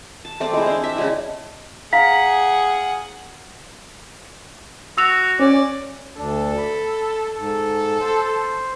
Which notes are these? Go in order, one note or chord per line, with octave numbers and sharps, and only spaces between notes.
A5
A3 C4 D5
G#3 E4
C4 D4
E5
C#3 G#3 E4
G#4 F5 F#5 A#5 B6
F#4 E6 F7
C#4 D5
D2 D4 A4
B5
G#2 A4
C5